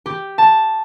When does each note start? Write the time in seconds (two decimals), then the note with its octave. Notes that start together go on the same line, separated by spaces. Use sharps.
0.06 G4
0.38 A5